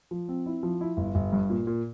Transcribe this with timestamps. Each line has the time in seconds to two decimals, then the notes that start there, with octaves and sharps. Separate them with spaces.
0.11 F3
0.29 C4
0.46 E4
0.63 F3
0.81 E4
0.97 G1
1.15 G1
1.33 G2
1.50 A#2
1.67 A#2